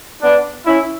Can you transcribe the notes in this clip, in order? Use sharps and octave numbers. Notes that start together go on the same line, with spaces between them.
B3 D4
C#4 E4